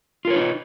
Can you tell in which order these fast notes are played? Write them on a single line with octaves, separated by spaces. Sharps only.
F4 A#4 C#5 B4 D#4